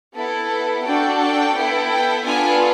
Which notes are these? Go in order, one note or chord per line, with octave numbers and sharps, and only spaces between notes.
B3 E4 A4
D4 F#4 A4 G5
G5
B3 E4 A4
G5
B3 D4 F4 A4 G#5